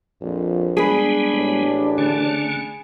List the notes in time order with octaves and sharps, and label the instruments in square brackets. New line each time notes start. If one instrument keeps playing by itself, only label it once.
[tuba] A#1 [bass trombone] F2
[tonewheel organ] G3 G#3 B3 [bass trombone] D4 [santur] G#4 B4
[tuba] A1
[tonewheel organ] D3 A3 C#4